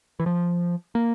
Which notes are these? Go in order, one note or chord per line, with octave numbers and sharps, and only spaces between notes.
E3
F3
A#3